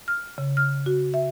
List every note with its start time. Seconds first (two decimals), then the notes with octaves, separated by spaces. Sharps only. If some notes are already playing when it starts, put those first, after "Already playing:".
0.08 F6
0.38 C#3
0.57 F6
0.86 F#4
1.14 E5